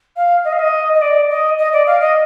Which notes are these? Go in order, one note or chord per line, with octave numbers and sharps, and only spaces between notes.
F5
D#5
F5
D#5
D#5
D5
D#5
D#5
D5
F5
D#5